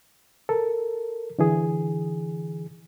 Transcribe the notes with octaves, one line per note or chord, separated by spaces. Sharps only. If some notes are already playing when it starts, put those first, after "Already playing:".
A4 A#4
D3 E3 G#4